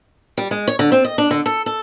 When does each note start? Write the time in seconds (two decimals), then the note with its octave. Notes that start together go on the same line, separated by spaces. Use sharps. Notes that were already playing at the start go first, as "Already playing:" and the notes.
0.38 G3
0.51 G#3
0.68 C#5
0.79 D3
0.92 C4
1.05 D#5
1.18 D4
1.31 D3
1.46 A4
1.66 A4